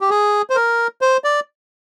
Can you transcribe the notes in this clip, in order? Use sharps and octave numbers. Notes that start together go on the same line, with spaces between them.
G4
G#4
C5
A#4
C5
D5